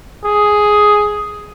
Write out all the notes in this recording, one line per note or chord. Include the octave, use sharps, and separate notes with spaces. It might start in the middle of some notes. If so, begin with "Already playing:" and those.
G#4